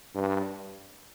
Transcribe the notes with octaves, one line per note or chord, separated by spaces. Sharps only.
G2